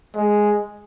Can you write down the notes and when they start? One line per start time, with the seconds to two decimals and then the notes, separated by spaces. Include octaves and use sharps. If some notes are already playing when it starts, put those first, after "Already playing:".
0.15 G#3